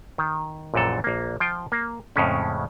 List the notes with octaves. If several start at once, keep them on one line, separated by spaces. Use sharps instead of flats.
D#3
A#1 F#2 A#2 E3 A4
A#1 A#3
F3 F4 G5
A#3
F2 A2 C#3 G#3 C#4